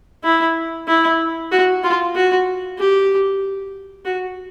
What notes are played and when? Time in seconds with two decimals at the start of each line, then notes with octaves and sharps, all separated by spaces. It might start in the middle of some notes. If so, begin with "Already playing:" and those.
0.24 E4
0.88 E4
1.51 F#4
1.84 F4
2.15 F#4
2.78 G4
4.05 F#4